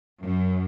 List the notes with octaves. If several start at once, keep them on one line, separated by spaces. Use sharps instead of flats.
F#2